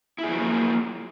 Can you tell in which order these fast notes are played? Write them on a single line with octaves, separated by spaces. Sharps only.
E4 G#4 F3 F#3 A#3